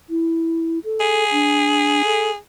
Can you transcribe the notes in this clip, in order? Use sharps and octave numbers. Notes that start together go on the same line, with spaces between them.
E4
A4
G#4
D4
A4